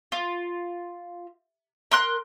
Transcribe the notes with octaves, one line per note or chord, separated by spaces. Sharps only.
F4
A#4 C6 F#6